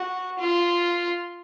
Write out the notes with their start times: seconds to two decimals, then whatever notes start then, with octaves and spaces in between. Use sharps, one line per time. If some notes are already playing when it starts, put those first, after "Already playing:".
Already playing: F#4
0.39 F4